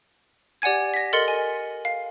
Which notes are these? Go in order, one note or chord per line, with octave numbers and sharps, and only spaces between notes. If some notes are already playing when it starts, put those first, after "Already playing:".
G4 D5 F#5 G#5 G#6
A#6 B6
A4 A#4 D#5 C6 A6 C#7
G#5
F5